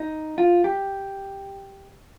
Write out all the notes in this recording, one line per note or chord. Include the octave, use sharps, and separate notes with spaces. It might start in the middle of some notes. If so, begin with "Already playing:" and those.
Already playing: D#4
F4
G4